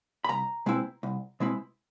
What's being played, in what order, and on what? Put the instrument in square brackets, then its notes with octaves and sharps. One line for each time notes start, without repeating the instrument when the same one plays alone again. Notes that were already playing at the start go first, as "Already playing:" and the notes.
[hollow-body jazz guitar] B5
C2 A#5
B2 G#3 C4 E4
C2
B2 G#3 C4 E4